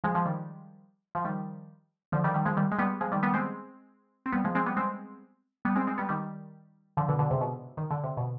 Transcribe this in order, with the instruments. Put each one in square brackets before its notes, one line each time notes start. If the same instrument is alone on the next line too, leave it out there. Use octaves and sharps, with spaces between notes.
[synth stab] F3 G#3
F3 G#3
D#3 G3
F3
D#3 G3
D3 F3
D#3 G3
D#3 G3
F3 G#3
D#3 G3
G#3
G3 B3
F3 G#3
D#3 G3
G3 B3
G#3 C4
C4
G3 B3
F3 G#3
G#3 C4
G3 B3
G#3 C4
G3 B3
G#3 C4
G#3 C4
G3 B3
D#3 G3
D3 F3
B2 D3
B2 D3
G#2 C3
B2
D#3
D3
C3
B2